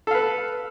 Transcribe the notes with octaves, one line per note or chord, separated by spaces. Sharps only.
A4 B4 F5